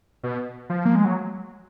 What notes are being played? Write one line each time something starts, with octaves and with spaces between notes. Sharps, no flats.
B2
F3
A#3
G#3
F#3